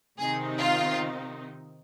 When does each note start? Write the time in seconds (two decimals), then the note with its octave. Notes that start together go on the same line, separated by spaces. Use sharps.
0.19 C3 D#3 C4 D#4 G#4
0.58 F4